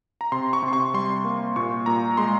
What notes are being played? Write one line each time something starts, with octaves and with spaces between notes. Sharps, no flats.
A#5
C3 C6
C#6
C3
C6
C#6
G3 C6
A#3
A#2 C#6
A#2 A#5
G#3 C6